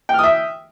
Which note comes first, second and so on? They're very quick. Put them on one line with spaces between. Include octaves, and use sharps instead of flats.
G5 F6 D#6 E5